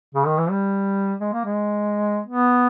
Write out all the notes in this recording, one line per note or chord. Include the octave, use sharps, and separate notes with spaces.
C#3
D#3
E3
G3
G#3
A#3
G#3
B3